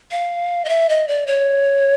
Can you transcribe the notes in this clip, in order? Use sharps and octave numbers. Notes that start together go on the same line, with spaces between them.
F5
D#5
E5
D#5
D5
C#5